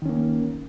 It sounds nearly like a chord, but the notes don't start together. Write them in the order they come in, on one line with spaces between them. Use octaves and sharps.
D#3 C#4 A#3